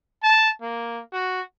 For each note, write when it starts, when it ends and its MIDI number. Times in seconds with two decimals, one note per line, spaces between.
0.24 0.49 81
0.62 1.01 58
1.13 1.41 66